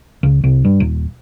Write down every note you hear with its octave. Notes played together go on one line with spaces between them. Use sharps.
C#2
C2
G2
D#1